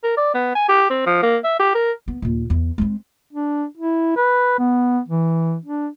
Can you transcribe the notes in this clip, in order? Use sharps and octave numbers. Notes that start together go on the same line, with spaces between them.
A#4
D5
B3
G#5
G4
C4
F3
A#3
E5
G4
A#4
B3
D#2 A#2
E2
G#3 C4
D4
E4
B4
B3
E3
D4